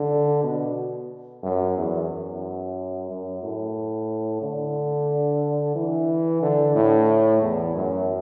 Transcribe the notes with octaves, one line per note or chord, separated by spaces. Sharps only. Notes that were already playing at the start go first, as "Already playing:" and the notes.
Already playing: D3
B2
F#2
E2
F#2
F#2
A2
D3
E3
D3
A2
E2
F#2